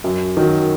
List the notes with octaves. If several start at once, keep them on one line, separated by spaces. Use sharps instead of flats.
F#2
D#3 F#3